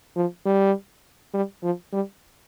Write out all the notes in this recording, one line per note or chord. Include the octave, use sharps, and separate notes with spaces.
F3
G3
G3
F3
G3